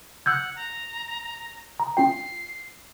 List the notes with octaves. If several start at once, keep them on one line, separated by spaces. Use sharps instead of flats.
F#5 E6 G6 G#6
A#5
A#5
C#4 F4 G5 C7